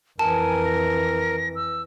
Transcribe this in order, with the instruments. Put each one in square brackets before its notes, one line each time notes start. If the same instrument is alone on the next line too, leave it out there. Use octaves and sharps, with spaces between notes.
[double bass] F2 E3 [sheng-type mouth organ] A#4 [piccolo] G#5 [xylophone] A5
[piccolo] A#6
E6